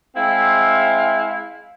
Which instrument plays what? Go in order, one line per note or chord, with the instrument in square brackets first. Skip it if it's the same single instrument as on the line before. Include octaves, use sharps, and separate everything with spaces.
[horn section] G#3 C4 E4 E5 F5